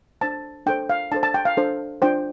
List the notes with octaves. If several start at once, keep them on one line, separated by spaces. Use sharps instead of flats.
D4 A4 C5 A5
D4 A4 C5 G5
F5
D4 A4 C5 A5
A5
G5
F5
D4 A4 C5
D4 F4 C5 G5